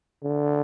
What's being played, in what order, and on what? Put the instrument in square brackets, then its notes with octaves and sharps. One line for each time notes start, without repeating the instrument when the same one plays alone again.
[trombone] D3